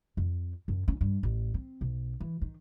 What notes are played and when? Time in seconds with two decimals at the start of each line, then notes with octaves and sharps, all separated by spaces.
0.17 F2
0.68 F#2
0.88 C#4
1.01 G2
1.23 A1
1.54 C4
1.81 B1
2.20 E3
2.42 D#3